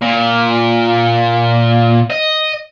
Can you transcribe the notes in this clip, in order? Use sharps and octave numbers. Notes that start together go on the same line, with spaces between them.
A#2
D#5